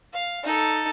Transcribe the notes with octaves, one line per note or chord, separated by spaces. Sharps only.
F5
D#4 A4